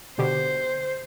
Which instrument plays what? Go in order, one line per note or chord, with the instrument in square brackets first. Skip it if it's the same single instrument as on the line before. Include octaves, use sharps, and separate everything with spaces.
[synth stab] B2 D3 G4 [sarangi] C5